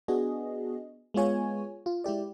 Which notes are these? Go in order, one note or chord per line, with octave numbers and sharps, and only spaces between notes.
B3 D4 F#4 G#4 D#5
G#3 B3 F4 C#5 G#5
F4
G#3 E4 G4 D5